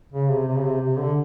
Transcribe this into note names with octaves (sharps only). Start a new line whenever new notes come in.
C#3
C3
C3
C#3
C3
C3
D3